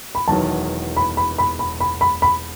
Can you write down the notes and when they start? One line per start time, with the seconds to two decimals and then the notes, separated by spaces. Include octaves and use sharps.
0.15 B5
0.28 E1 E2 D#3 F#3 A5
0.97 B5
1.17 B5
1.38 B5
1.59 B5
1.80 B5
2.01 B5
2.22 B5